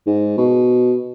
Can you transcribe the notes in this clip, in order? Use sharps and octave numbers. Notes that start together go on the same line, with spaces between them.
G#2
B2